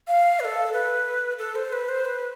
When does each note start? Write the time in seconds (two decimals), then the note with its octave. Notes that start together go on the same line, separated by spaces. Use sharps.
0.08 F5
0.40 B4
0.44 A4
0.73 B4
1.39 A4
1.55 C5
1.73 B4
1.89 C5
2.05 B4